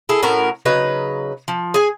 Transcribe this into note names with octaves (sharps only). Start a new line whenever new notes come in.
E4 G#4 A4
A2 C#4 F#4 A#4
C#3 F#3 D#4 B4
F3
G#4 G#5